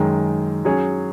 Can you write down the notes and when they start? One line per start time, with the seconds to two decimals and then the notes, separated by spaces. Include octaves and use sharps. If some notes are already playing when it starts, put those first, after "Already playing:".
Already playing: F#2 D#3 G#3
0.65 F#3 C#4 G#4 C#5